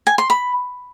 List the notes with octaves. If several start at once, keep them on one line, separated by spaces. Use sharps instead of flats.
G#5
C6
B5